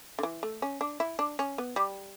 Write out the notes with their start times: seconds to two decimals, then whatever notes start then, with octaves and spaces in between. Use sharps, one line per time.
0.19 D3
0.23 E3
0.43 A3
0.62 C#4
0.81 D4
1.00 E4
1.19 D4
1.39 C#4
1.58 B3
1.76 G3